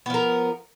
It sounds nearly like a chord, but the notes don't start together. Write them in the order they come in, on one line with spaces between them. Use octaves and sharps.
B3 F3 A#4